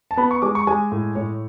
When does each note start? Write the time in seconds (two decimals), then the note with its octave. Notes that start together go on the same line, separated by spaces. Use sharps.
0.11 A5
0.17 B3 B5
0.31 C#6
0.42 G#3 D6
0.55 C#6
0.67 G#3 G#5
0.92 A2
1.15 A2 C#5